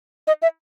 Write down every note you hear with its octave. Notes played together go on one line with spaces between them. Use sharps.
D#5
E5